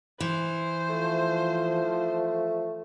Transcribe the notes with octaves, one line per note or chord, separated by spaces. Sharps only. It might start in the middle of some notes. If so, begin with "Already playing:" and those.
E3 C5
F3 A3